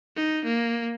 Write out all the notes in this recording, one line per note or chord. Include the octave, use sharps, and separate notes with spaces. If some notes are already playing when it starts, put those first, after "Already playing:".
D#4
A#3